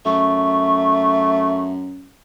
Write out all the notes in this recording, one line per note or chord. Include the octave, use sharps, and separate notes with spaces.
F#2 A3 C#6